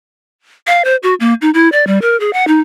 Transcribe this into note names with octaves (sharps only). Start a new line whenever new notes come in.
F5
C5
F#4
A#3
D#4
E4
D5
G3
A#4
G#4
F#5
D#4